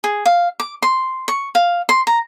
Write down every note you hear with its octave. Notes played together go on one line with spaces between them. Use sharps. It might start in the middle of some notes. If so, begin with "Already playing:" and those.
G#4
F5
D6
C6
C#6
F5
C6
A#5